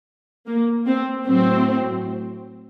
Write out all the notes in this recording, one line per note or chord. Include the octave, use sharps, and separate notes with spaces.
A#3
C4
A2 F#3 C4